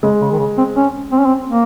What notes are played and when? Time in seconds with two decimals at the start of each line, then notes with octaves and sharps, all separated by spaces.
0.03 C#3 G#3
0.21 C#3
0.31 D#3
0.39 C#3
0.57 C4
0.76 C#4
1.12 C4
1.19 C#4
1.26 C4
1.48 A#3